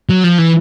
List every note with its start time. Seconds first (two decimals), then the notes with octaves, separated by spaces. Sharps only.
0.09 F#3
0.24 F3
0.39 E3